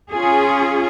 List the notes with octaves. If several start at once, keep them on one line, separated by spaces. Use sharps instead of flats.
C#4 F4 G#4